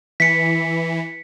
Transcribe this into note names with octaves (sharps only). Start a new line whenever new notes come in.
E3 B6 C#7